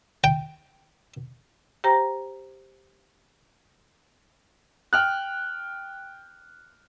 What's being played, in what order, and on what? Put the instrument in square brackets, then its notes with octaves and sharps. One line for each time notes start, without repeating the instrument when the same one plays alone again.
[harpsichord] G5
[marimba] G4 C5 G5 A#5 A#6
[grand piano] G5 F6 F#6